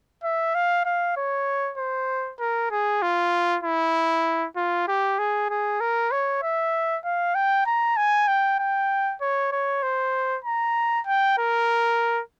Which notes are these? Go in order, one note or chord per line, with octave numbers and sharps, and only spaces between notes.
E5
F5
F5
C#5
C5
A#4
G#4
F4
E4
F4
G4
G#4
G#4
A#4
C#5
E5
F5
G5
A#5
G#5
G5
G5
C#5
C#5
C5
A#5
G5
A#4